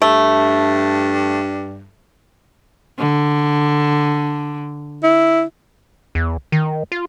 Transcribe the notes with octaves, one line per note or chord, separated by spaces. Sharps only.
G2 A3
D3
E4
E2
D#3
F4